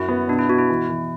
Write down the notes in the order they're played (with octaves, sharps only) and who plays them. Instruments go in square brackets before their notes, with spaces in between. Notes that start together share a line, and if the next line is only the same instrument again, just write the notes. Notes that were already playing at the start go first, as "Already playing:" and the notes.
Already playing: [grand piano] F#2 F#4 [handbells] E4
[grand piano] B3
[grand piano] B2 [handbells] D4
[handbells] E4
[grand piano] B2 [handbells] F#4
[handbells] E4
[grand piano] E3
E3